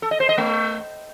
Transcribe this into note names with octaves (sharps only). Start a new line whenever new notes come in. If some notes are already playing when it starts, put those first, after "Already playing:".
A4
D#5
C5
D#5
A3